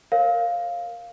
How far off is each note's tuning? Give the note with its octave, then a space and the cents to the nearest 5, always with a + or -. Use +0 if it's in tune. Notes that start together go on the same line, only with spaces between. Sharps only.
A#4 +0 C#5 -30 F5 +0